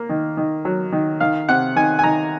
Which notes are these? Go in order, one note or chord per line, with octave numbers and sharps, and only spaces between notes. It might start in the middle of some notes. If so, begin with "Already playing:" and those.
Already playing: A#3
D#3
D#3
F#3
D#3
D#3 F5
C3 F#5
D#3 G#5
G#5
D#3 A#5